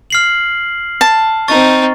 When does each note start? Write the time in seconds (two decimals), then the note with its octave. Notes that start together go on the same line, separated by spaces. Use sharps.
0.10 F6 C7 F#7
1.01 A5
1.48 C4 D#4 C#6 A6